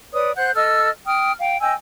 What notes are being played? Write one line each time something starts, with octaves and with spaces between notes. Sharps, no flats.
B4 C#5 D5 D#6
C5 F#5 F#6 G6
A4 D#5 E6 F6
G5 D#6 F6
F5 G5
D#5 G5 G#5 E6